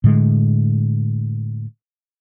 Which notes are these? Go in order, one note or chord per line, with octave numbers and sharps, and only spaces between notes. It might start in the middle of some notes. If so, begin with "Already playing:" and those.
A2 D3 G#3